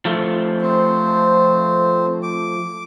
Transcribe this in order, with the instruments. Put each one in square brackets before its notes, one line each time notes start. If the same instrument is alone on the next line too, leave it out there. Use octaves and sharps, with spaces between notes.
[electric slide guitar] F3 A3
[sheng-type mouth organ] C4
D6